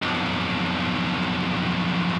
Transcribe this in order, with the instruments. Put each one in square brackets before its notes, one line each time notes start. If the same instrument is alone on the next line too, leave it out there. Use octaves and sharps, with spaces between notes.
[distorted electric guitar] B1 F2